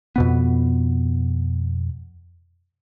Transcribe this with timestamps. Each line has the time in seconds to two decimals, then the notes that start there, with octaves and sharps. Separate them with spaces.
0.16 F2 B2 B3